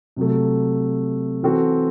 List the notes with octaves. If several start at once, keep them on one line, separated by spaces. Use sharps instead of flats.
C3 F#3 A3
E3 C4 F#4 A4